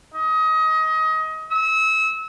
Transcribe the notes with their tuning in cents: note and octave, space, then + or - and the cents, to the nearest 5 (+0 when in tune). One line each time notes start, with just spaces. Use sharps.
D#5 +25
E6 -30